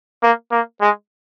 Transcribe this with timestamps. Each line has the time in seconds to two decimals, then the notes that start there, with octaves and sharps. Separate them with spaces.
0.23 A#3
0.51 A#3
0.81 G#3